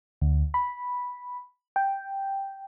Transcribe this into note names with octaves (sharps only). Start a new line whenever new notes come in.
D2
B5
G5